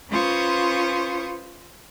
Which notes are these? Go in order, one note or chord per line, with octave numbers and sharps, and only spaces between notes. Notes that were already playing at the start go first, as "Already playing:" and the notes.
C#4 F4 B4 C5 C#6 D#6